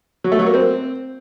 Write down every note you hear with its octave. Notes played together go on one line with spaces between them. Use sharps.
F#3
A3
F#3
A#3
C4